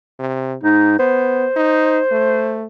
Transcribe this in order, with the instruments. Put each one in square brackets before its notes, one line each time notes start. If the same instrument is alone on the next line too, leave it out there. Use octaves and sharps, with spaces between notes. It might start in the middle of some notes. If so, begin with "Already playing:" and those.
[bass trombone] C3
[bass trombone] G#2 [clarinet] D#4
[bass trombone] B3 [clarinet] C5
[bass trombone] D#4
A3